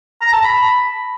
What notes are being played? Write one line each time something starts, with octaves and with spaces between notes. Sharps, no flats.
A#5
A5
B5